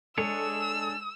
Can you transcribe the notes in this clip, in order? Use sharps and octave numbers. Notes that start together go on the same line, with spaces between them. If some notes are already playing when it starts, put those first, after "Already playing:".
G#3 D4 G#4 A4 C#5 E6 C#7